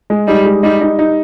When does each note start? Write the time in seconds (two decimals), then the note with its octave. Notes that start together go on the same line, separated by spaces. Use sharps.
0.10 G#3
0.27 G3 D#4
0.45 G#3
0.63 G3 D#4
0.81 D#4
0.99 D#4